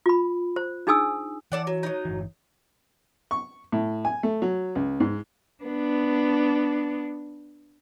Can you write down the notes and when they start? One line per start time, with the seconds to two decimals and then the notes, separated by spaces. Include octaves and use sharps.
0.06 F4 B5
0.56 C5
0.87 D4 D#4 G#4 G#5 D#6 E6
1.52 E3 A4 D5 F#5
1.67 F#3
1.83 F#3 D#4
2.05 G1 E3
3.31 C#6
3.72 A2
4.05 G#5
4.23 A3
4.42 F#3
4.75 C#2
5.00 G#2
5.64 B3 D4